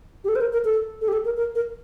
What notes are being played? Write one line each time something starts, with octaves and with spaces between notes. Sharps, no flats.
G4
A4
C5
A#4
A#4
A4
A4
G4
A4
A#4
A#4
A#4